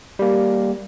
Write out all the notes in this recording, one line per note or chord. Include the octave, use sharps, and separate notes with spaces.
G3 A#3